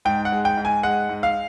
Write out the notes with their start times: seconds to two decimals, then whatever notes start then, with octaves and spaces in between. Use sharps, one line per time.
0.05 G#2 G5
0.25 F#5
0.32 G#3
0.45 G5
0.57 G#2
0.65 G#5
0.83 G#3 F#5
1.09 G#2
1.23 F5